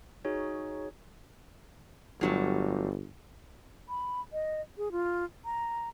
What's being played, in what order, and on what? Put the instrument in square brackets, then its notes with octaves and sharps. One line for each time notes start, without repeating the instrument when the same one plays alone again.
[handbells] D#4 F#4 G#4 C#5
[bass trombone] G1 [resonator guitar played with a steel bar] A2 F#3 G3
[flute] B5
D#5
G#4
F4
A#5